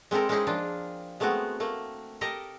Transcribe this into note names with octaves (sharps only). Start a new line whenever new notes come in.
G#3 C4 E4 A4 A#4
G#3 C4 C#4 D#4 E4 G#4
F3 A#3 D4 F4
G#3 A3 B3 C4 F#4
A3 A#3
G4 A4 A#4 D#5 A#5